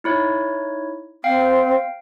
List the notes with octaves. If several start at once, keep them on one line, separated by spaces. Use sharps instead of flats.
D#4 E4 C#5
C4 F5 G5